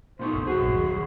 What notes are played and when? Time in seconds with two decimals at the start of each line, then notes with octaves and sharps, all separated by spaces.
0.19 A#2 B3 D#4 C5
0.33 F#1 C2
0.47 F#3 F#4 G#4
0.61 A#1 G2
0.75 D#2
0.90 D#1